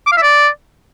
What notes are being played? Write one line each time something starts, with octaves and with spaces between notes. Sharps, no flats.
D6
F5
E5
D5